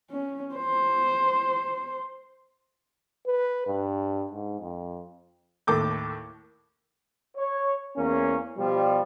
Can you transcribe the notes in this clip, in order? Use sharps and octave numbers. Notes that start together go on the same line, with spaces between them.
C#4
C5
B4
G2
G#2
F2
D#2 A2 A4 D6 G6
C#5
E2 A#3 C#4
B2 F3 G3